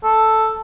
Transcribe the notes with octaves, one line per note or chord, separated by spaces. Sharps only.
A4